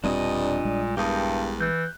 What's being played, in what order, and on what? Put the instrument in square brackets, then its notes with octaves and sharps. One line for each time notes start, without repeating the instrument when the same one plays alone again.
[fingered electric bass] E1 G3 C4 [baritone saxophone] G2 [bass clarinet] A#2 [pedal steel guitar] D4 D#5 D#6
[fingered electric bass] A#1 G3 G#3
[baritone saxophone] E2 [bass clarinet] G2 [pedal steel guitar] G4 A#4 D#6
[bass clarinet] E3 [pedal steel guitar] F#6 G6